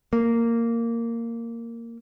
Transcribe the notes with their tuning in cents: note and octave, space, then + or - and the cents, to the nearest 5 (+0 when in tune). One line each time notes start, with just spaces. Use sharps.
A#3 -10